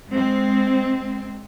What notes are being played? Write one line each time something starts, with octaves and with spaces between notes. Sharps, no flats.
G#3 C4